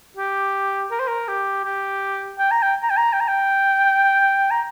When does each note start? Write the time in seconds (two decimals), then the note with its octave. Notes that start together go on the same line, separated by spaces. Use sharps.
0.17 G4
0.91 A#4
0.99 C5
1.08 A#4
1.28 G4
1.64 G4
2.39 G5
2.51 A#5
2.63 G5
2.83 A#5
2.90 G5
2.97 A#5
3.13 G5
3.21 A#5
3.28 G5
4.51 A#5